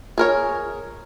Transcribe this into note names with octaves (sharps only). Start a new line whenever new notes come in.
G#4 A#4 C#5